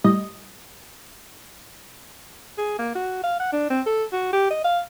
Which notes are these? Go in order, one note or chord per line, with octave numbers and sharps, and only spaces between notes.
A2 G3 D#5
G#4
A#3
F#4
F5
F#5
D4
C4
A4
F#4
G4
D#5
F5